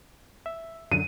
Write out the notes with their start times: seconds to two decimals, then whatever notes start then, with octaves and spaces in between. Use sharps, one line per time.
0.46 E5
0.92 F#2 D3 F#3 D#7